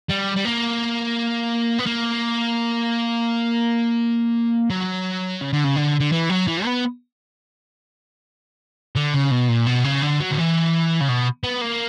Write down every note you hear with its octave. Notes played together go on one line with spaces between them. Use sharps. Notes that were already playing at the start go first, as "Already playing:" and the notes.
G3
G3
A#3
B3
A#3
F#3
C#3
D3
C#3
D3
D3
E3
F#3
E3
B3
D3
C#3
B2
A#2
B2
C#3
D3
F#3
D3
E3
C#3
B2
B3
A#3